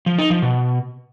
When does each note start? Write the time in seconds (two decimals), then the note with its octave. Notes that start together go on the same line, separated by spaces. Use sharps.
0.06 F3
0.18 D#4
0.30 F3
0.42 B2